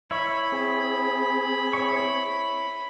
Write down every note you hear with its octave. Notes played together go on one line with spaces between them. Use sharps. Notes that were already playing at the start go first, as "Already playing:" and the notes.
E4 C#5 B5 C#6
C4 G#4
E4 C#5 C#6